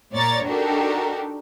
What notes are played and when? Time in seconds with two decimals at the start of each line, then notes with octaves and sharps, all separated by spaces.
0.14 A#2 C#5 D5 A#5 A6
0.46 D4 D#4 F#4 G4 A4 A#4